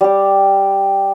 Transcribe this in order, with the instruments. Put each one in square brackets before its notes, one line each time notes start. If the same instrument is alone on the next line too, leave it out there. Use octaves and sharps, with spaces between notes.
[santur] G3 G4